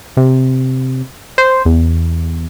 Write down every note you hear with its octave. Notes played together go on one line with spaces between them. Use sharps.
C3
C5
E2